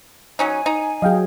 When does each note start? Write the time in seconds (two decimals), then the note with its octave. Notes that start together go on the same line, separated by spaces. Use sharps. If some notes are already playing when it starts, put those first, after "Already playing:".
0.39 F#3 C#4 D#4 G#5
0.66 D#4
1.02 F#3 G#4 D#5 F5 G5